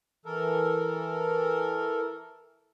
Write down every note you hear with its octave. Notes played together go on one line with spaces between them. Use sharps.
E3 A4 A#4